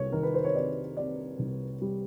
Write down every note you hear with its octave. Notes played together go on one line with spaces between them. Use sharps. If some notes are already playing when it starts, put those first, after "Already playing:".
Already playing: C2 C#5
D#3 A#4
B4
C5
C#5
C3 D5
C3 D5
C2
G3